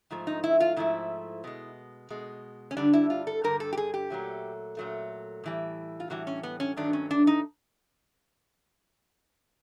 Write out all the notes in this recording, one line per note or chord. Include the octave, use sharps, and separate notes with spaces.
G#2 F3 A3
D#4
E4
F4
G#2 F3 A3 E4
B2 G#3
B2 G#3
C#4
G2 D3 G3 D4
E4
F4
A4
G2 D3 G3 A#4
A4
G4
G#4
G4
A#2 F#3 A3
A#2 F#3 A3
A2 E3 G3
F4
A2 E3 G3 F#4
C#4
B3
C#4
G2 D#3 F#3 A3 D4
C#4
D4
D#4